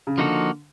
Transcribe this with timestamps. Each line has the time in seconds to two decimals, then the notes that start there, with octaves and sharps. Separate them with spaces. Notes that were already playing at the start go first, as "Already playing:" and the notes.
0.07 C#3
0.18 D3 F3 A#3 D#4 F#4 A4